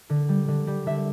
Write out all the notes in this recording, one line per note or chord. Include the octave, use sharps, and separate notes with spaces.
D3
G3
D3
G3
D3 E5